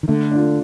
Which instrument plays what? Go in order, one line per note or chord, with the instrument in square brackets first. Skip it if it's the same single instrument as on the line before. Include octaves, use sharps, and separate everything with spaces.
[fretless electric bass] D#3
[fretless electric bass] D3 [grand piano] A3
[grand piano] D4 F4